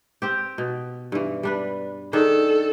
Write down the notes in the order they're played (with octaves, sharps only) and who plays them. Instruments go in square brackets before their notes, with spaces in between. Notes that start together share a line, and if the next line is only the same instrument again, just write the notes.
[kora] C4 G4
B2
G2 E3
G3 D4 B4
[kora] D#3 D4 G#4 [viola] A4